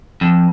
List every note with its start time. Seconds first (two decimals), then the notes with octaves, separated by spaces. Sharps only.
0.21 F2